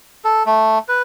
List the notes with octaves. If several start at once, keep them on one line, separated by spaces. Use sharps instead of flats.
A4
A3
B4